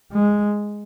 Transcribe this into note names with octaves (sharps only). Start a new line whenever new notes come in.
G#3